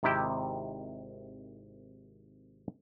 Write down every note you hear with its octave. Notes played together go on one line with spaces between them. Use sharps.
G#1 C3 D#3 E4 G4 G5